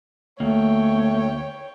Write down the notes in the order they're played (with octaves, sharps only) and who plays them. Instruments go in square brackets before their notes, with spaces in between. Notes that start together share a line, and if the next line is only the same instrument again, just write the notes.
[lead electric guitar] D2 A#3 [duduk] A3 [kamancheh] C#5 G5